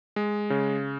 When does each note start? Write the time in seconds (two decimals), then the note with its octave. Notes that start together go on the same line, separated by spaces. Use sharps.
0.16 G#3
0.50 C#3